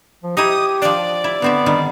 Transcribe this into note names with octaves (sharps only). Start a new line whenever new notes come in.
F3
D#4 E4 G4 D#6
F3 D4 D5
E4
D3 B3 C4 E5
D3 D#3 G3